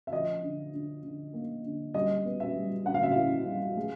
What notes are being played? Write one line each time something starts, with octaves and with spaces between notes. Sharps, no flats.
E5
F3 D#5
D3
D3
D3
A#3
D3
G3 D#5
B3
E5
G3
D3 F#5
F5
E5
E4 F5
G3
G#3